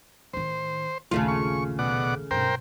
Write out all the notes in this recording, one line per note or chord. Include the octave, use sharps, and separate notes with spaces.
A1 D#3 C5
A#1 D#2 C#3 A3 F4
C#6
B2 D5 F#5
B1 G2 A#4 C5 G5